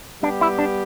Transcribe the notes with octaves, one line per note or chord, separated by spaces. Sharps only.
G3 B3 D4 G4
E4
D4